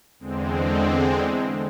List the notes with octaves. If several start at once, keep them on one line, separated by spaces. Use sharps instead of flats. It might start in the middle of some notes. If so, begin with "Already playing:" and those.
E2 D3 G#3 C4